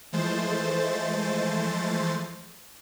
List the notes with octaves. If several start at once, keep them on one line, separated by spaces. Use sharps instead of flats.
E3 F3 G#3 A3 C5 A6